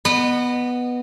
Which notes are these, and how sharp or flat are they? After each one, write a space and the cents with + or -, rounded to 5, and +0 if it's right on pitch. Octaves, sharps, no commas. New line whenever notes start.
B3 +0 D#5 -30